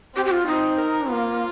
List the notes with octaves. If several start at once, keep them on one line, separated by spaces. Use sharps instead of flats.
C4 G4
G4
F4
C4 D#4
A#4
A#3 F4